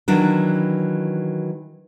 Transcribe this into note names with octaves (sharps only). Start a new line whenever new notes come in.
D#3 E3 F#3 D4